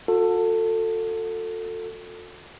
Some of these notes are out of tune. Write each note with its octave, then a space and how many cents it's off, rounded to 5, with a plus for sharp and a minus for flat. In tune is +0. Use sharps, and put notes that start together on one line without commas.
F#4 -40 A4 +20